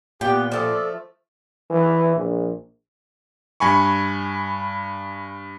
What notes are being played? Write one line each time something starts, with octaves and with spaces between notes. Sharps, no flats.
A#2 B3 G4 G5
F3 A3 A4 D5
E3
A#1
G2 G#5 B5 C#6